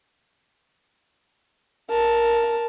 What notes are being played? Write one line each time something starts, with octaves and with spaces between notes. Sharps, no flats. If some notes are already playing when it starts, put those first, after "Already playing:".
A#4 A5